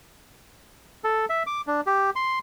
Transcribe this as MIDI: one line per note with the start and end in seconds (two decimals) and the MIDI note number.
1.04 1.26 69
1.30 1.43 76
1.47 1.61 86
1.67 1.81 62
1.87 2.10 67
2.16 2.39 84